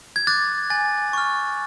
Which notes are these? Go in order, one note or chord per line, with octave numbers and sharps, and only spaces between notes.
G#6
D6 F#6 A6
G#5 A6
C#6 F6